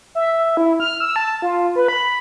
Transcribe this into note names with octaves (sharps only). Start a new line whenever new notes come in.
E5
E4
F6
E6
A5
F4
B4
B5